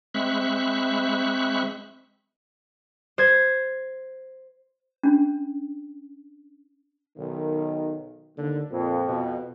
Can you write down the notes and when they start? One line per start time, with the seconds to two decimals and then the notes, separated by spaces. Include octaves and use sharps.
0.14 G#3 C4 E5 B5 C#6 F#6
3.18 C5 G#6
5.03 C#4 D4
7.18 B1 D#3
8.38 D#2 D3
8.71 F2 A#2
9.08 B2